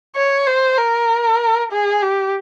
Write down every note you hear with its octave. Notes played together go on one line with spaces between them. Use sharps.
C#5
C5
A#4
G#4
G4